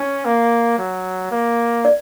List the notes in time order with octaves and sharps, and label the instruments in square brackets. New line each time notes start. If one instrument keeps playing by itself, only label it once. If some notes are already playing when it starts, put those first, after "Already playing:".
Already playing: [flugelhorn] C#4
A#3
F#3
A#3
[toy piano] D5